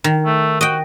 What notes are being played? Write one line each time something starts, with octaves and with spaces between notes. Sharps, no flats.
D#3
A3
F#4 D#5 G5